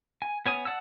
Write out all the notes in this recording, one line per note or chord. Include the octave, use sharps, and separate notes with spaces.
G#5
B3 C#5 G#5 D#6
D5 F#5 A5 E6